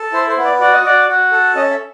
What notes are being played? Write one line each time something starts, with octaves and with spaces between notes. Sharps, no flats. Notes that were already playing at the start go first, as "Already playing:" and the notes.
Already playing: A4
E4 C5
C5
B3
D5
F#4 D5
D#5
F#4 D5
F#4
A4
C#4 D#5
E5